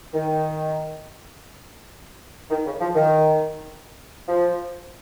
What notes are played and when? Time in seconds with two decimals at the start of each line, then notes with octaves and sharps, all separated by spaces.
0.14 D#3
2.51 D#3
2.66 C#3
2.81 F3
2.95 D#3
4.28 F3